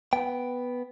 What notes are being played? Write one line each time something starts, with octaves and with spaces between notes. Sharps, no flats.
B3 G5